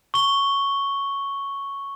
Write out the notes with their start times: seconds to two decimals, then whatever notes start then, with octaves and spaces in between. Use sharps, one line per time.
0.14 C#6 G7